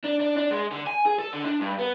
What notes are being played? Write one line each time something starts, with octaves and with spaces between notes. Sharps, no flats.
D4
D4
D4
G#3
D3
G#5
G#4
A4
D3
D4
G2
B3